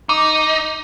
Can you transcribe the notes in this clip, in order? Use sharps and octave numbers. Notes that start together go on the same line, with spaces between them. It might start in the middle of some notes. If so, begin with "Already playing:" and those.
D#4 D6